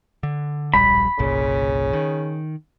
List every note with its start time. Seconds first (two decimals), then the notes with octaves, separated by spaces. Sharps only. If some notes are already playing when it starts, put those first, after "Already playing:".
0.23 D3
0.74 D1 A#1 G3 B5
1.19 G1 C2 A#2 C#3
1.93 D#3